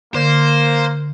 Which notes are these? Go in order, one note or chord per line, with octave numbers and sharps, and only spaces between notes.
D3 A#3 C5